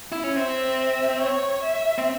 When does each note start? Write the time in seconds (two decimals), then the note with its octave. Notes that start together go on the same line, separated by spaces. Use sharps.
0.12 E4
0.24 C#4
0.36 C4 E5
1.20 C#5
1.63 E5
1.98 C4